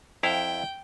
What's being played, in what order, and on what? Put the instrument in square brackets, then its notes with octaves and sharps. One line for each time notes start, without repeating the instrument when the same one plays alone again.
[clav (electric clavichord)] F2 E4 F5 [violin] G5